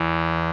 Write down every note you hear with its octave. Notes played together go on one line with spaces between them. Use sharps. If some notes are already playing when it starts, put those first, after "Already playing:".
Already playing: E2 E3